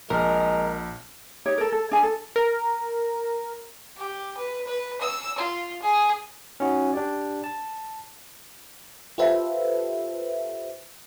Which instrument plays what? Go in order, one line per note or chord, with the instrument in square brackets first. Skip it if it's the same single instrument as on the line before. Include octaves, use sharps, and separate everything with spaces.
[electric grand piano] A#1 F6 [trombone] G#3 [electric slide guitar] A#4
[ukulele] D#4 G4 C#5
A4 A#4
A4
D4 G#4 G#5
A4
[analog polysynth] A#4
[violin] G4
B4
B4
E6
F4
G#4
[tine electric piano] C#4 D#4 F#4
D4 G4 D5
A5
[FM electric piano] F4 G4 A4 B4 C5 E5